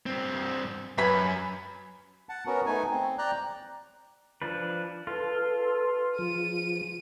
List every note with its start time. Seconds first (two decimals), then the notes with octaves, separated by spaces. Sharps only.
0.06 G2 C4
0.98 F#2 B4 G#5 B5
2.29 F#5 A5
2.46 B3 C#4 F#4 A#4
2.66 A3 B3 D#4 G#5
2.90 C4
3.18 D5 G5 A#5 F#6
4.42 F3 D4 B4
5.07 F4 A4 B4
6.18 F3 G#4 D#7